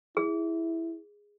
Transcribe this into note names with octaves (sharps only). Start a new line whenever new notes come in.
E4 G#4